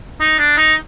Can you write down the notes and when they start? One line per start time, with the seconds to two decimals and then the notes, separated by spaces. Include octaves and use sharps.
0.21 D#4
0.39 D4
0.58 D#4